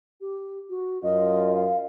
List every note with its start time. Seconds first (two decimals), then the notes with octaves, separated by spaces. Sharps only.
0.21 G4
0.70 F#4
1.03 F#2 F4 D#5
1.56 F5